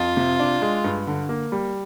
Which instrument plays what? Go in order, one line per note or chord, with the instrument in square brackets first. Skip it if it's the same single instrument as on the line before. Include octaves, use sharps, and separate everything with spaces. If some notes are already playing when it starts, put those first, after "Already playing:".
Already playing: [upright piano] F2 [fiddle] F4
[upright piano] C3
D4
G#3
G2
D3
A#3
G3